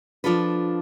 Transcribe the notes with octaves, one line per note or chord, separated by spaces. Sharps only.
F3 D4 F4 A4 B4